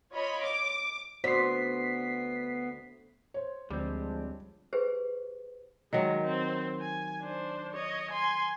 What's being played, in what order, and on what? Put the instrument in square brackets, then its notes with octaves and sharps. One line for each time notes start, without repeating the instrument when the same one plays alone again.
[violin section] F4 C#5 D#5 B5
D6
[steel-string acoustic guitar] D2 [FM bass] B3 [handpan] C5 D5 [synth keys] B6 C7
[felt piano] C5 C#5
[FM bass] D2 [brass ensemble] F3 G#3 D4 [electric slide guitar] G3 C4
[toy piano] G4 G#4 B4 C5
[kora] D#3 F#3 [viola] G#3
[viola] C4
G#5
D4 C5
C#5 D#5
G#5 C6